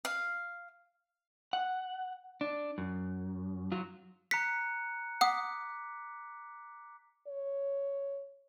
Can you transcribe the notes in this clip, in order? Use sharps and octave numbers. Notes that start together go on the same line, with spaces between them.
F5
F#5
D4
F#2
F#3 F4
A#5 F#6 B6 C#7
F#5 D6 D#6 B6
C#5